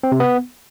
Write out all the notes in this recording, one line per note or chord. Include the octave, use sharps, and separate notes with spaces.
C4
C3
B3